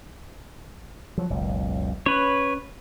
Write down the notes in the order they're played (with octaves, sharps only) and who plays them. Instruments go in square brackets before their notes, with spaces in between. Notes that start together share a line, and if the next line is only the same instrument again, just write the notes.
[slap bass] F3 F#3
F#1 C#2 B2
[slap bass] C#4 [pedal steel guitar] B4 C#5